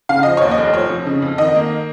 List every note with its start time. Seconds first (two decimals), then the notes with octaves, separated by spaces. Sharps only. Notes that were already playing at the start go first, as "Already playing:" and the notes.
0.09 C#3 F5
0.23 F3 D#5
0.37 D#2 C#5
0.51 D#5
0.57 F1
0.74 F3 C#5
0.90 F2
1.06 C#3
1.22 F2
1.38 D#3 D#5
1.55 A#3